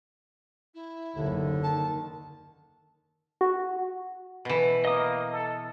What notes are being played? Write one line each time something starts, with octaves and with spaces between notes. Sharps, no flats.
E4
F#1 D#2 D3
D#3 A5
F#4
B2 E3
A#3 D#5 D#6
A4